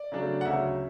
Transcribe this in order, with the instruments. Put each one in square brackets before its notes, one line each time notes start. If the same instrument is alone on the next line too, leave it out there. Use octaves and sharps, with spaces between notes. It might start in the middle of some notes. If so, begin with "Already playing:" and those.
Already playing: [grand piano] D5
C#3 F#3 A3 D4
F#5
D2 C#3 F#3 C#4 E5